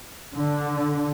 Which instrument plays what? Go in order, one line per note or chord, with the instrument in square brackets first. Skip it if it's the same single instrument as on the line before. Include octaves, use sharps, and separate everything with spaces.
[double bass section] D3